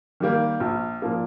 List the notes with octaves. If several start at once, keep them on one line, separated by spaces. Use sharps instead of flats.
D#3 G3 A#3
A#1
A#2 F3 A#3